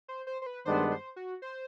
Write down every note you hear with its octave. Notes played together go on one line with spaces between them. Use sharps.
C5
C5
C5
B4
G2 D#3 G#3 B3 D4 C5
C5
F#4
C5